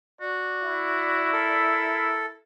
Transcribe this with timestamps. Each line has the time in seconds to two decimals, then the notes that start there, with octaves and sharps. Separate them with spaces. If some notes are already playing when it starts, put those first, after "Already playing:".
0.21 F#4 D5
0.63 E4
1.33 A4 A#4